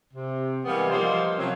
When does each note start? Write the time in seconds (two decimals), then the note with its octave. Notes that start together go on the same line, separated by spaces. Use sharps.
0.14 C3
0.65 E3 G3 G#3 A#3 B3
0.90 F3 G3 A#3 D#4 C5
1.37 C3 F3 F#3 C4 C#4 F4